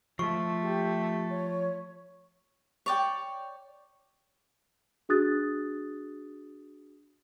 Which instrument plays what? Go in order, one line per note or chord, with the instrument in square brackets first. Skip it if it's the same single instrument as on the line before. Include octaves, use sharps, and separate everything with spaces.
[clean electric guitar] F3 [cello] A3 [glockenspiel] C#6
[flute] G4
C#5
[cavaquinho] C#5 D5 G5
[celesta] D4 F#4 G#4 D#6 F#6 A6